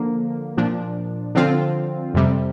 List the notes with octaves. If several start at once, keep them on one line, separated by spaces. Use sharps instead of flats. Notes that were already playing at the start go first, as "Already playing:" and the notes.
Already playing: D3 F3 A#3
A#2 F3 D4
D3 F3 C4 F4
F2 C3 G3